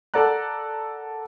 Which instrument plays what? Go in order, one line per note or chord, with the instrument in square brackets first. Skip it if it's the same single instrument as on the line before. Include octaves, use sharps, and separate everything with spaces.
[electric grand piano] A4 A#4 D5 F#5 A#5 F#6